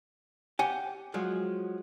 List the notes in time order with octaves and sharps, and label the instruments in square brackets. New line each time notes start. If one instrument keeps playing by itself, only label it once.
[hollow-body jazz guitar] G4 [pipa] F#5 G#5
[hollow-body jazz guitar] F3 F#3 G#3